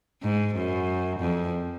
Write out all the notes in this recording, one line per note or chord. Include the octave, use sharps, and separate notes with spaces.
G#2
F#2
F2